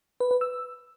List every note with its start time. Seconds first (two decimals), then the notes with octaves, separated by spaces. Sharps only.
0.20 B4
0.31 B4
0.41 E6